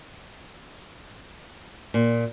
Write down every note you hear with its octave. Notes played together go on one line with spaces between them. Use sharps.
A#2